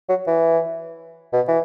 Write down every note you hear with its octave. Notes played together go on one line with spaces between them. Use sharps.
F#3
E3
B2
E3